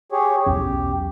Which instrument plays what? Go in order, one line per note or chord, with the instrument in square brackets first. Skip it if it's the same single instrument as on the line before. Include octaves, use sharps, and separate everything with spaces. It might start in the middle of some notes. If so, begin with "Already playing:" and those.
[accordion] G4 G#4 C#5
[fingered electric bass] B1 E2 C#4 [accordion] G4